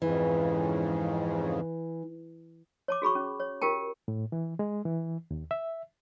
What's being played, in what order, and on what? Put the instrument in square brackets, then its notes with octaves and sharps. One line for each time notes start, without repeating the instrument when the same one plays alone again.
[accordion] F2 G#2 C#3 [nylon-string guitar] E3
[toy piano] C#5 A5 D6
F#4 G#4 B5 C#6
C#4
C#5
F4 G4 A#4 G5 A5
[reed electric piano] A2
E3
G#3
E3
D#2
E5